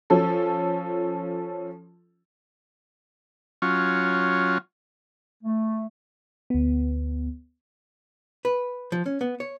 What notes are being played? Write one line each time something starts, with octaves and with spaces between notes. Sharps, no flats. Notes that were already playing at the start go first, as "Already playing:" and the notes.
F3 C#4 A4
F#3 C#4 F4
A3
D2 B3
B4
F3
C#4
B3
C#5